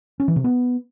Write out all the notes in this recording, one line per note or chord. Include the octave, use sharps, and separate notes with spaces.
C#4
E3
C3
B3